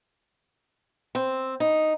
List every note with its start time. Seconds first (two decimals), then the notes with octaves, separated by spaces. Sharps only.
1.15 C4
1.60 D#4